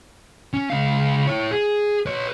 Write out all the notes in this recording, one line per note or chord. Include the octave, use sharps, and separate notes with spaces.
C#4
C#2 F5
E4 C#5
G#4
B4 C#5